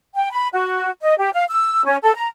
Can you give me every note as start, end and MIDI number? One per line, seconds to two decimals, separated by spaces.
0.15 0.31 79
0.32 0.48 83
0.52 0.90 66
1.02 1.14 75
1.18 1.30 67
1.33 1.43 77
1.50 1.84 88
1.85 1.96 61
2.02 2.14 69
2.15 2.27 82